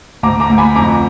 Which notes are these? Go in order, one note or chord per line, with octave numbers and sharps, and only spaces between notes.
D2 A#5 D6
A#5 D6
D2
G#5 B5
F2 A#5 D6